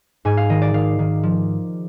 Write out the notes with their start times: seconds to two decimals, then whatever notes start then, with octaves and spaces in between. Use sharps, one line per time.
0.25 G#2 G#5
0.37 F5
0.49 D#3 D#5
0.62 D5
0.74 D#3 F5
0.99 D#3
1.23 F3